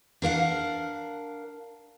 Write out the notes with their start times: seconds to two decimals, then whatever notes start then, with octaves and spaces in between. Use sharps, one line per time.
0.22 D4 A#4 F5 F#5